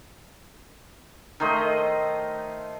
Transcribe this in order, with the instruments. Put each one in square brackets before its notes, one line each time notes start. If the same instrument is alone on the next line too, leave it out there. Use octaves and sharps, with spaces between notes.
[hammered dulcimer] D#3 A3 C5 D#5